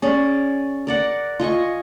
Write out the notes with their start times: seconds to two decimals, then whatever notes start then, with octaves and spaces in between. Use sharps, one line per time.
0.02 C#4 G#4 D5
0.87 A#4 D5 F#5
1.40 F4 D#5 G#5 C#6